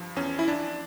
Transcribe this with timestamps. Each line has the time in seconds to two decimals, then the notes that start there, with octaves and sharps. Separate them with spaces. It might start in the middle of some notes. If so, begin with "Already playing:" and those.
Already playing: G2 F3
0.16 E2 C#4
0.39 E4
0.48 D4